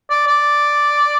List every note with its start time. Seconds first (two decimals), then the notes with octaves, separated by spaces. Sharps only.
0.10 D5
0.27 D5